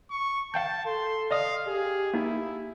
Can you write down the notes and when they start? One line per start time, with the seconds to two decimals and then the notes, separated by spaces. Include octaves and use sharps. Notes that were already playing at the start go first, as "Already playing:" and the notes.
0.10 C#6
0.54 F5 G5 A5 G6
0.86 A4 C6
1.31 D5 D#5 F5 D#6
1.67 G4 G#4
2.14 A#3 D#4 E4